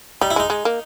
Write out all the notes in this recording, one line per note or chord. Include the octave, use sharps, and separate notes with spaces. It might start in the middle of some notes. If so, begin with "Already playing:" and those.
G3 D#4
E4
G#3 D#4
G#3
A#3